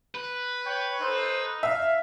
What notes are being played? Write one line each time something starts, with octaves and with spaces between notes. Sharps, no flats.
B4
C#5 G5
D#4 A4 C5
E5 F5